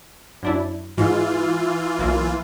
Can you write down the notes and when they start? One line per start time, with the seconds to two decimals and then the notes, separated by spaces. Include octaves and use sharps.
0.43 F#2 D4 E4
0.97 G#2 E3 F4
1.99 B1 A#3